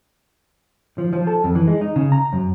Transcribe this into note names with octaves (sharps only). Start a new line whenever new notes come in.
F3
F3
A4
F2
E3
G#3
D#4
C#3
A#5
F#2